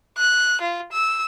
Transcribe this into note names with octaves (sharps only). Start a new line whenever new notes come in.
F#6
F4
E6